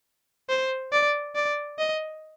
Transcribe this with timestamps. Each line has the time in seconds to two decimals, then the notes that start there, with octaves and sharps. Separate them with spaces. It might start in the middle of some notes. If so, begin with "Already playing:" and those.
0.49 C5
0.93 D5
1.35 D5
1.79 D#5